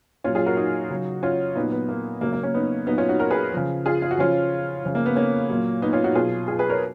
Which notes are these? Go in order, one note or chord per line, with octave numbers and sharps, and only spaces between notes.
A#2 F#3 C#4 F4
F4 G#4
F#4 A#4
D#4 F#4
C#3 F#3
C#4 F4
A#2 F#3 B3 D#4
B3
A#3
C#3 F#3 A#3
A#3
A#3 C#4
B3 D#4
A#2 F#3 B3 D#4
C#4 F4
D#4 F#4
F#4 A#4
G#4 B4
C#3 F3
F4 G#4
F4
F#4
C#3 F3 C#4 F4
C#3 F3
A#3
B3
A#3 C#4
A#2 F#3
B3 D#4
C#4 F4
D#4 F#4
B2 F#3 F4 G#4
F4 G#4
G#4 B4
A#4 C#5